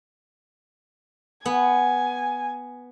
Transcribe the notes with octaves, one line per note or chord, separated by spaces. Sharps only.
B3 G#5